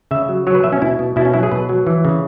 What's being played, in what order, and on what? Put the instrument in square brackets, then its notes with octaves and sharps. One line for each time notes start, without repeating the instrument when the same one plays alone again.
[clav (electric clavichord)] C#3 E5
F#3
F#3 C#5
B4
B2 E5
C#4
B2 E4
B2
B2 E4
C#4
F#3 E4
G#4
B2 B4
F#3
E3
C#3